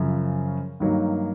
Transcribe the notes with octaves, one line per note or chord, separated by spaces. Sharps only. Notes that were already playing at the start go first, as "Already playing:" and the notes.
Already playing: F#2 C#3 F3
G2 D#3 F#3 A#3 D#4